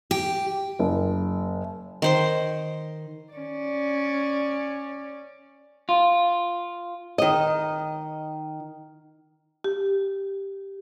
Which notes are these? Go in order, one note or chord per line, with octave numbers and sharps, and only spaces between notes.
G4
F#1
D#3 C5 C6
C#4 D5
F4
D#3 D#5
G4